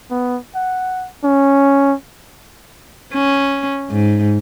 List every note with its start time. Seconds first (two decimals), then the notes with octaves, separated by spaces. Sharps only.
0.11 B3
0.55 F#5
1.24 C#4
3.14 C#4
3.90 G#2